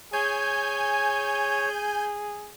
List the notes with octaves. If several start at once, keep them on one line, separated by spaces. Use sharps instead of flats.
G#4 C#5 G#5 G6